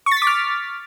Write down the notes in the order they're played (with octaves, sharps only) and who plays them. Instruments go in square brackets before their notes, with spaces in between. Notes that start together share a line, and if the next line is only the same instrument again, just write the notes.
[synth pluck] C#6
A6
B6
D6
F6